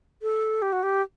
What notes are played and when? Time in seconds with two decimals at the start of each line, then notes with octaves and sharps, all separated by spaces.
0.22 A4
0.62 G4
0.73 F#4
0.83 G4